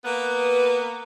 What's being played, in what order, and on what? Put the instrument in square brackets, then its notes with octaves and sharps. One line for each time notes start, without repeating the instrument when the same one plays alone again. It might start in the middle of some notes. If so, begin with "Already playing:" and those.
[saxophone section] A#3 B3 B4